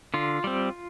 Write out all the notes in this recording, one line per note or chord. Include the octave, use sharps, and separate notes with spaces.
D3 F4
G3 C4